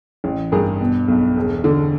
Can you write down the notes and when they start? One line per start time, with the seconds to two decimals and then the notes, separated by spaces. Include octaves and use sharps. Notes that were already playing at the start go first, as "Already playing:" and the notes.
0.24 A1
0.52 G2 G#4 A#4
0.80 B2
1.08 B1
1.37 E1
1.64 D3